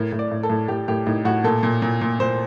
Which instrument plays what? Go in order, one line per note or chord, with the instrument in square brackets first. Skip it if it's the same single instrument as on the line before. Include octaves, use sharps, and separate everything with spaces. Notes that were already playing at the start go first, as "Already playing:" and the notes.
Already playing: [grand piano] A2 A#4
A2
D5
A2
A4
A2
A2 G4
A2 G4
A2 D#4
A2 F#4
A#2 A4
A#2
A#2
A#2
A#2 C5